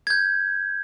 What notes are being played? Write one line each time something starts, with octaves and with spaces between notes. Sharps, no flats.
G6 G#6